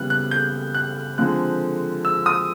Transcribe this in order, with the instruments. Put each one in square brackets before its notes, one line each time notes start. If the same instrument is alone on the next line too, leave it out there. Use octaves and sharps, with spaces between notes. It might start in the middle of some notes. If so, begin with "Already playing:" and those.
Already playing: [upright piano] C#3 E3 G3 B3 F#6
F#6
G6
F#6
D3 F3 G#3 C4 F#6
E6
D#6